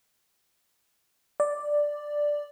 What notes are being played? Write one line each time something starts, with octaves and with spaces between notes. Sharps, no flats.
D5